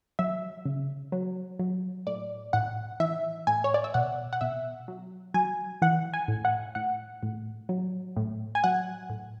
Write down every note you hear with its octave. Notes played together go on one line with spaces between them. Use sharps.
F#3 E5
C#3
F#3
F#3
A2 D5
A2 F#5
E3 E5
A2 G#5
C#5
D5
E5
B2 F#5
F#5
B2 E5
F#3
F#3 G#5
E3 F#5
G#5
A2
F#5
A2 F#5
A2
F#3
A2
G#5
F#3 F#5
A2